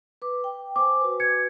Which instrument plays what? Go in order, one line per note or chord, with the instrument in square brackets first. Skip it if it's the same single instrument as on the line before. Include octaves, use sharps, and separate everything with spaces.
[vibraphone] B4 D6
G5
[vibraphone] C5 G#5 [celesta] D6
[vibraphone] F#4 B4
[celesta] G#6 C#7